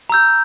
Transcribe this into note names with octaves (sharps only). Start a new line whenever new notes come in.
A#5 E6 G6